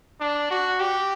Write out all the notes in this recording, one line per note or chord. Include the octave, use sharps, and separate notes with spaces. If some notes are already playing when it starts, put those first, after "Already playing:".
D4
F#4
G4